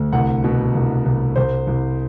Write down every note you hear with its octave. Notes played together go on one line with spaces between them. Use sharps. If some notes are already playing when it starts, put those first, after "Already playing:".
Already playing: D2 D3
C2 F#5
B2
C2
C2
C2 C5
C2